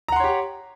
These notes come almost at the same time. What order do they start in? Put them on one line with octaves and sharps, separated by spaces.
A#5 F#5 C6 C#5 G4